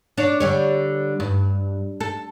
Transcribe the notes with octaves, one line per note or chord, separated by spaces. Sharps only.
D4 C#5
D3 G3 C#5
G2
A4